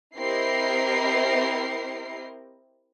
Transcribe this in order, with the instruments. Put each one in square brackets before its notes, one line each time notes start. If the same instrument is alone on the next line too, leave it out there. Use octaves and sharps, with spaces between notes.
[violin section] C4 E4 G4 A#4 D#5 C7